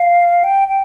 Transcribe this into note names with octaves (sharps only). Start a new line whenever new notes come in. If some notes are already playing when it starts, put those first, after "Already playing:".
Already playing: F5
G5
G5